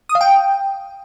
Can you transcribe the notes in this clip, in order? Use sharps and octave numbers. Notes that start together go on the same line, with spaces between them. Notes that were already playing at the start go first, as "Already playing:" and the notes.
D#6
F5
G5